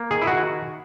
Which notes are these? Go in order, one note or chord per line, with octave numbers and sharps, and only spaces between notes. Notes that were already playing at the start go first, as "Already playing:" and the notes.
Already playing: A#3
D#3 G#4
E4
D#3 F#4